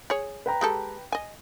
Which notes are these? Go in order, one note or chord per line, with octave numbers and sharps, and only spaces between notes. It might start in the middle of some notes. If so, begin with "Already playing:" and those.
G#4 C#5
B4 G5 A#5
G#3 G4 A4
D#5 G#5